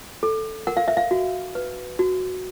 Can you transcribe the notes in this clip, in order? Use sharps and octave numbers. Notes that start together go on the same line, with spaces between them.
A4
A#4 F#5
F5
E5
F5
F#4
B4
F#4